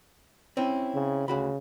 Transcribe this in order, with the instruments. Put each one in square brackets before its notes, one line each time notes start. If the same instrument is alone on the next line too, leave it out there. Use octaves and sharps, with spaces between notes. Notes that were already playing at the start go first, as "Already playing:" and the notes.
[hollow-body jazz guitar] C4 C#4 E4
[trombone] C#3
[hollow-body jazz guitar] D2 F#4 B5 [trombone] C#3